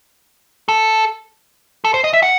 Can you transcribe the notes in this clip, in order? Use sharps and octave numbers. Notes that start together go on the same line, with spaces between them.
A4
A4
C5
D#5
E5
F#5